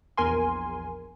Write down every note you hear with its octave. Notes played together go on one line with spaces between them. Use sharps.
A#1 E2 A#4 G#5 C6